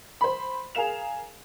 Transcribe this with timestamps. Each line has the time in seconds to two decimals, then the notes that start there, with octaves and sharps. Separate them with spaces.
0.21 C5 B5
0.75 G#4 A#4 F5 E7 F7